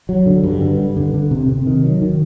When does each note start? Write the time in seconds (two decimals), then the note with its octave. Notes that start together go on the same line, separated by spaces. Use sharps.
0.09 F#3
0.26 D3
0.44 G2
0.61 D3
0.79 G2
0.96 D3
1.14 D3
1.31 C3
1.49 C3
1.67 D#3
1.84 F#3
2.02 D#3